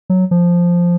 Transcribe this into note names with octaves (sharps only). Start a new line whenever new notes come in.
F#3
F3